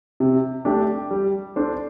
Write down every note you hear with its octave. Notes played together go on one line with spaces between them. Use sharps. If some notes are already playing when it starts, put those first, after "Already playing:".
C3
A3 D4 G4
G3
D4 A4 C5